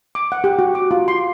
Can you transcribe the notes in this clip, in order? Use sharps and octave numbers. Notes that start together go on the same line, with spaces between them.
D6
F#5
G4
F#4
D6
F4
C6